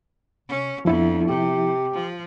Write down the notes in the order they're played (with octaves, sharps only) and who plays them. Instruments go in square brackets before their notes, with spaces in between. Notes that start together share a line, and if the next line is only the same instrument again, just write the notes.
[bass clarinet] C3 [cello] C#4
[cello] F2 B3 [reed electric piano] F3 E4 [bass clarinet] D4
[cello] C3 [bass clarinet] G4
[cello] F3